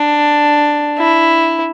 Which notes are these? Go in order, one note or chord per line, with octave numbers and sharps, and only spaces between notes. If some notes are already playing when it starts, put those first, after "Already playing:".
Already playing: D4
E4